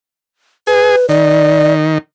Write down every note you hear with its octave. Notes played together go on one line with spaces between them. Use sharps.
G#4 B4
D#3 D5